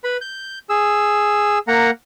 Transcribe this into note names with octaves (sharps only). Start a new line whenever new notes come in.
B4 B5
G6
G#4 E6
A#3 F#5 A#5